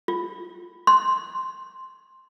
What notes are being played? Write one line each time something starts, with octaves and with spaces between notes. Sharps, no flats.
F4
C6